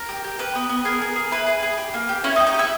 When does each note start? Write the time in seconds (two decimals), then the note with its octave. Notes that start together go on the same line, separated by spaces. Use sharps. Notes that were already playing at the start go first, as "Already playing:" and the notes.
Already playing: A#4 A#5
0.09 G4
0.24 G4
0.39 G4 B4
0.55 B3
0.69 B3
0.85 G#4 A#4
1.01 G#4
1.16 G#4
1.31 E4 B4
1.46 G#4
1.63 G#4
1.77 G4
1.94 A#3
2.09 G4
2.24 C#4 E4 C#5
2.36 D#4 D#5
2.40 G4
2.47 D#4 D#5
2.54 G4
2.59 E4 E5